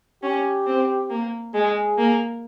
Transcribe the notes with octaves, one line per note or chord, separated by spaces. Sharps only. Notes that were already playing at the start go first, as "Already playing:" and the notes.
C#4 G4
C4
A#3
G#3 G#4
A#3